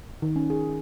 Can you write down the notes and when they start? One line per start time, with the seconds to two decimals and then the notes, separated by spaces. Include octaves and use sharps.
0.22 D#3
0.36 C#4
0.50 G#4